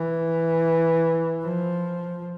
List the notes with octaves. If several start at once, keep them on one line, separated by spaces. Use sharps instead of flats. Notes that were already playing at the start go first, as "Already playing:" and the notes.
Already playing: E3
F3